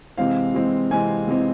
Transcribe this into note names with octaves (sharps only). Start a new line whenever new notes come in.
C3 E3 G#3 C4 F5
C3 E3 G#3 C4
C3 E3 G#3 C4 G#5
C3 E3 G#3 C4